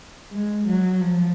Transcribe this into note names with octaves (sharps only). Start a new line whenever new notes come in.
G#3
F#3
F3